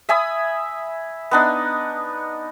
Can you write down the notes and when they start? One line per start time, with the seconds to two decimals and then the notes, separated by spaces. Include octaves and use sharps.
0.09 E5 G#5 B5 D#6
1.31 B3 D4 D#4